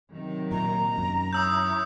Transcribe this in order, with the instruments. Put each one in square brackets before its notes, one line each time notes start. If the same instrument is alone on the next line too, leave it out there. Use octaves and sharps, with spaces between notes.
[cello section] C3 D#3 F#3
[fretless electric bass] A#2 [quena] A#5
[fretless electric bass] F#2
[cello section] E4 C#5 [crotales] D#6 E6 G6